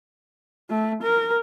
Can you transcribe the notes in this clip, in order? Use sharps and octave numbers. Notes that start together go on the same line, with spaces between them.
A3
A#4